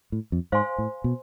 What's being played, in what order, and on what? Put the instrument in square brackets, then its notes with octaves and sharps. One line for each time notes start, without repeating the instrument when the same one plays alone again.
[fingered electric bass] A2
F2
[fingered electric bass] G#2 [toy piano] C5 F5 G#5 C6
[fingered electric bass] A2
B2